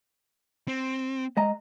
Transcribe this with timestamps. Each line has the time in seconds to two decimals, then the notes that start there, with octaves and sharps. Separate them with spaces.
0.68 C4
1.37 G#3 D#5 A#5